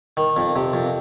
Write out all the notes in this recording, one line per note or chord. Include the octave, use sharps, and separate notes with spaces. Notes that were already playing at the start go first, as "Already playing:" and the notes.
D#3
F2
C3
F2